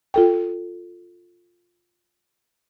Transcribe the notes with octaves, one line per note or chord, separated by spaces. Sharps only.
F4 A4 G5